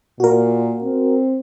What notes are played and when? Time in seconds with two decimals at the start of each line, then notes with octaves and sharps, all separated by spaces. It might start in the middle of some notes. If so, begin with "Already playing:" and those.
0.20 A#2 F#4 A#4
0.83 C4